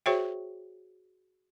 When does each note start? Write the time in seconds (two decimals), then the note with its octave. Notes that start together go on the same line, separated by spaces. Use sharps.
0.06 F#4 G#4 C5 C#5 E5 G5